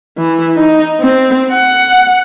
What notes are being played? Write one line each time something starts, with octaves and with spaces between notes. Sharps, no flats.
E3
D#4
C4
F#5